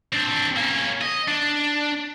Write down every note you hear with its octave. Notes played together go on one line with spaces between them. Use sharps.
C4 D4
A#3 C#4
D#5
D4